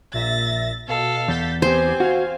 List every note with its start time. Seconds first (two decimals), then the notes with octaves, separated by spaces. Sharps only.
0.13 A#1 A#2 E5 A6 A#6
0.88 B2 A4 F5
1.28 E2 G6 A6 B6
1.62 B3 C4 G4 C5 G#5
2.00 F#4 F5